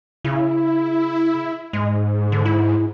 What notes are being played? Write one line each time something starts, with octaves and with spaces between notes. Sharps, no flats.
C#3 E4
G#2 G#3
D3
E4